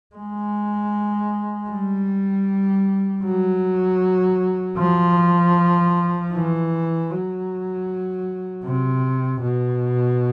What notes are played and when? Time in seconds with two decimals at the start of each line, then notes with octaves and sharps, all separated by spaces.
0.16 G#3
1.70 G3
3.25 F#3
4.78 F3
6.33 E3
7.11 F#3
8.64 C3
9.42 B2